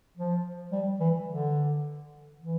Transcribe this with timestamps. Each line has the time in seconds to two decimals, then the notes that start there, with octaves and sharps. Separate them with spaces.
0.17 F3
0.72 G3
1.00 E3
1.27 D3
2.39 E3